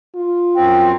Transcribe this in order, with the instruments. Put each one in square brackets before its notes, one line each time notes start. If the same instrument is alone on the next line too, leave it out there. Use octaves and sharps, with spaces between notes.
[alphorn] F4
[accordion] F#2 C4 [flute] G5